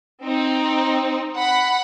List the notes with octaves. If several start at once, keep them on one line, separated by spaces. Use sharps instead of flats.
C4 D#4
F#5 B5